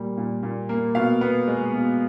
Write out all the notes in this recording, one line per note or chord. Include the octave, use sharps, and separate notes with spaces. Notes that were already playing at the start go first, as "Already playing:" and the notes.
Already playing: A#2 G3 A#3
A#2
A#2
A#3
B2 F5
B3
G#3
B2